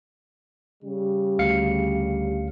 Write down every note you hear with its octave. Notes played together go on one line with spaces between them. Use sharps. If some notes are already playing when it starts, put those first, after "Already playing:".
C#3 G3
D2 F5 C#7